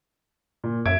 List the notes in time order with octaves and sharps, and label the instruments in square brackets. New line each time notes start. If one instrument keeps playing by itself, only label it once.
[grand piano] A#2
[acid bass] F#2 [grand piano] E5 G#6 D7